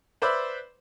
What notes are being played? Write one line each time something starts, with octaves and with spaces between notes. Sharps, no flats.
B4 C5 D5 E5 B5